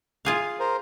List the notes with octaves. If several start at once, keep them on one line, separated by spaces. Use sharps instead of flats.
F4 G#4 F5
A#4 C5